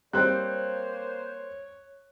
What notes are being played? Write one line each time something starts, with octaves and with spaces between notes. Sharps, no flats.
G3 A#3 C4 C5 C#5 F#6